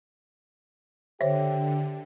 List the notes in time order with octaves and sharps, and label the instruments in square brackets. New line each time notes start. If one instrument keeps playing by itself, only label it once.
[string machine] D3 [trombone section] G4 [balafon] C5 C#5 [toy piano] E5